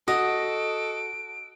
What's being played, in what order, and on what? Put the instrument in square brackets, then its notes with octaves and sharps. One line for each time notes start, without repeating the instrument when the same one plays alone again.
[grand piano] F#4 [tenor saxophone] A4 [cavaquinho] D#5 [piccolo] D7